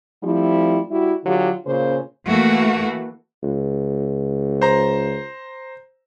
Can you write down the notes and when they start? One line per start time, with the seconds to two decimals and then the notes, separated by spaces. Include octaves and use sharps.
0.23 F3 G3 A3 C4 E4
0.91 G3 E4 F#4
1.24 D3 F#3 F4 G4
1.66 A#2 C#3 C#4 C5 C#5
2.26 E3 A3 A#3 F#4
3.43 C#2
4.62 C5 A#5